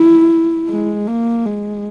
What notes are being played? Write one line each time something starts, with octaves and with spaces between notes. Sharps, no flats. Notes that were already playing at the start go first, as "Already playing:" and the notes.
Already playing: E4
G#3
A#3
G#3